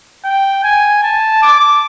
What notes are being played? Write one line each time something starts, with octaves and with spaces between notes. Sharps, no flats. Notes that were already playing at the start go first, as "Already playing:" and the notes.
G5
G#5
A5
D6